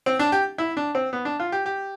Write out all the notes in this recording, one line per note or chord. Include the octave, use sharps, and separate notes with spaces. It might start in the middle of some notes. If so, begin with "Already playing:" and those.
C4
D4
G4
E4
D4
C4
B3
D4
F4
G4
G4